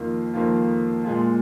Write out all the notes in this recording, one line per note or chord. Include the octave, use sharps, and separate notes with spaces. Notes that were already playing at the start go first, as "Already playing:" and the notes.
Already playing: F2 D#3 A#3 F4
F2 D#3 A#3 F4
A#2 G#3 F4